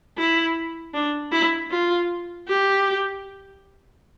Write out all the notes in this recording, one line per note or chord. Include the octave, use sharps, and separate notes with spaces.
E4
D4
E4
F4
G4